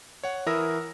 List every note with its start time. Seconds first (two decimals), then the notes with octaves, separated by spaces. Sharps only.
0.23 C#5 F#5
0.46 E3 E4 A#4 D#6 E6 A#6